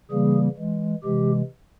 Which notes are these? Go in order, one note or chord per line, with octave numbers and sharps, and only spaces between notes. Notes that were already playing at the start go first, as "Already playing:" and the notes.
C#3 E3 G3 A#3 G#4
E3 G#3
C3 E3 G#3 G4